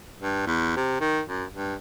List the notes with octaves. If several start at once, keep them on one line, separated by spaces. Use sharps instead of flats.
G2
E2
C3
D#3
F#2
G2